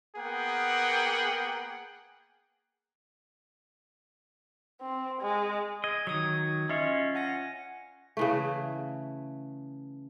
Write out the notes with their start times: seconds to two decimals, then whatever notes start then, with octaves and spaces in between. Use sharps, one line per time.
0.17 A#3 B3 G#4 A#4 F#5 G5
4.81 C4
5.22 G#3
5.84 D#5 G#6
6.07 D#3 F#3 D#6 G#6
6.69 C#4 F4 C#5 D#5 E5
7.15 F#5 G#5 A#6
8.17 C#3 E3 A3